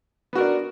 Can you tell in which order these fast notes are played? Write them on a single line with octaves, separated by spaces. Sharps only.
B3 F#4 A#4 D4